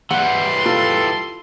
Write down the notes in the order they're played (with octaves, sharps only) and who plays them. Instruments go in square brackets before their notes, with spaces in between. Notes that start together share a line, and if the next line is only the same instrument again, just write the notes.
[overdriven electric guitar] E3 G3 [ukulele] F#5 [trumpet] C6
[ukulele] F4 [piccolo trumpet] A4